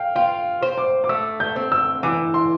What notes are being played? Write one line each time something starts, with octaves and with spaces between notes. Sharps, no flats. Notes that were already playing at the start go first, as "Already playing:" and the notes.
Already playing: F5 G5
F4 G5
C5
D6
D6
A3 E6
G6
C4
E6
E3 D6
C6